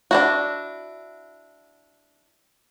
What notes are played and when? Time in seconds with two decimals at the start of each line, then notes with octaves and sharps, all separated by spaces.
0.11 D4 E4 F#4